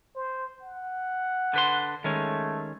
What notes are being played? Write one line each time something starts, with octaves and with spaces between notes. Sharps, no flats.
C5
F#5
D3 B4 C6
D#3 G#3 A3 C#4